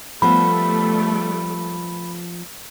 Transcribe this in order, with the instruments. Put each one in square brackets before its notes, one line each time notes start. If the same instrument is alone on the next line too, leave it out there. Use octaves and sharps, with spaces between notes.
[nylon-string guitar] F3 B3 [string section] G3 A3 [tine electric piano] B5